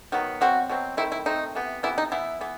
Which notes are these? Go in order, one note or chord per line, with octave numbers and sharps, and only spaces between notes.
D#3 F#3 B3
B2 F#3 C4 F#4
B2 F#3 C4
D#3 A3 C4 E4
E4
D#3 A3 C4 D#4
C3 E3 B3
C3 E3 B3 E4
D#4
E3 B3 E4
E3 B3